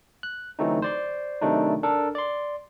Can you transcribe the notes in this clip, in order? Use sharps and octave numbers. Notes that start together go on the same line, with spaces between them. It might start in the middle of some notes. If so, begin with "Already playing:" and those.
F#6
D3 E3 F#3 A3 C4 D#4
C5 D5 C6
C3 D#3 F#3 A3 D4 D#4
D4 A4 A#4
D5 C6